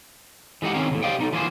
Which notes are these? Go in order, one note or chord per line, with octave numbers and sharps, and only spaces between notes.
E3 G#3 D#4 G4 F#5
D#3 E3 C4 C#4 G#4 A#4
E2 A2 C#3
G4 C5 D5 D#5 F5 G5
B1 D#4 A4
E3 F3 A#3 B3 G#4 C5